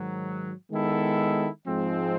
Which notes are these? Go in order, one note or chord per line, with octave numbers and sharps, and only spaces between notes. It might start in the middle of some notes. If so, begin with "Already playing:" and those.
Already playing: G#2 D#3 F#3
D#3 G#3 B3 E4 A4
G#2 F3 G#3 C4